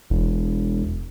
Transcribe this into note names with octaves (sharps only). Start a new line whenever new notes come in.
E1